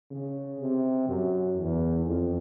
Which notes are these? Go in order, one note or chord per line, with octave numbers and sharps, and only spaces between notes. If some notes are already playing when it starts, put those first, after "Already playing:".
C#3
C3
F#2
E2
F2